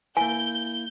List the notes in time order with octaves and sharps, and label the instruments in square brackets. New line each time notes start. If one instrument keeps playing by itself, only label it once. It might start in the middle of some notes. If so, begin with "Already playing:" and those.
[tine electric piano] A#3 E4 [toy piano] G#5 [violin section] G6